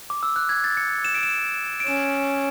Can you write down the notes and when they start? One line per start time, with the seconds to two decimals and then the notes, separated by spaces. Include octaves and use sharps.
0.10 D6
0.23 E6
0.36 F#6
0.49 G#6
0.64 A6
0.77 C#7
1.04 E7
1.14 D7
1.23 E7
1.80 D7
1.87 C#4 E7